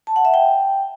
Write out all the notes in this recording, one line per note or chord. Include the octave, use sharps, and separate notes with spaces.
A5
F#5
E5
G5